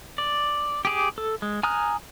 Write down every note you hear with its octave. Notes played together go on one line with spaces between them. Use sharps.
D5
G4 G#4 D6
A4
G#3
G#5 A#5 D#6 F6 F#6